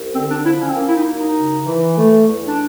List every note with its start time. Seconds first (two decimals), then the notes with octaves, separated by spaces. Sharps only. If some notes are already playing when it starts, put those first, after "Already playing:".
Already playing: C2
0.14 D3 C4
0.29 D4
0.45 F3 E4
0.60 C#4
0.68 C4
0.76 A#3 C#4
0.89 E4
0.96 D#4
1.06 F#2
1.16 D#4
1.36 C#3
1.66 E3
1.97 A3
2.27 E2
2.47 D4